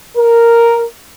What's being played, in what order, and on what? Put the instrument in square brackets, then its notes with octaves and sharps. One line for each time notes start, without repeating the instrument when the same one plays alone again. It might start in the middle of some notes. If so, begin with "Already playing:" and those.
[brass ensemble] A#4